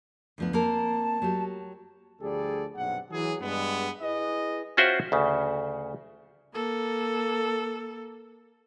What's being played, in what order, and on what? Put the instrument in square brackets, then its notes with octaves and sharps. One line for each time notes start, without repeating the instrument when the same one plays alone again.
[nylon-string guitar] D2 F3 B3
[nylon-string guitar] A#3 C4 A#4 [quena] A5
[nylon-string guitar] F#3 G4
[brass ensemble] D2 F3 G3 G#4 A4 D5
B1 G2 C3 F#5
E3 F#3 G#4
G2 G#3 B3
E4 G#4 B4 D#5
[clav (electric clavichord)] C#4 F4 F#4 C5 E5 G5
D2 C#3
[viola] A#3 A4